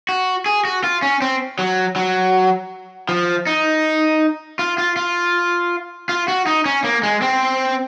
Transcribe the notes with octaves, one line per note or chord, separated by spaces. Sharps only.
F#4
G#4
F#4
F4
C#4
C4
F#3
F#3
F3
D#4
F4
F4
F4
F4
F#4
D#4
C#4
A#3
G#3
C4